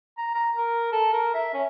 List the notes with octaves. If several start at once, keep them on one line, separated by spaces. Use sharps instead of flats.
A#5
A#5
A#4
A4
A#4
E5
C#4